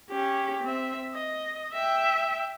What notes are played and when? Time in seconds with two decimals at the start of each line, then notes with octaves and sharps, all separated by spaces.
0.10 C#4 G4
0.63 C4 E5
1.14 D#5
1.73 E5 G5